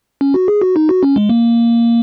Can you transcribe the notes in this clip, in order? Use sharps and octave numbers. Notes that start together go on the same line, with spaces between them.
C#4
F#4
G#4
F#4
D#4
F#4
C#4
G#3
A#3